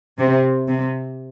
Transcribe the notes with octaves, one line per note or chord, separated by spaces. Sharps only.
C3
C3